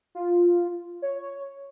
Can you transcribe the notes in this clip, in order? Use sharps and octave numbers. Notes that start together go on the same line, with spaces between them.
F4
C#5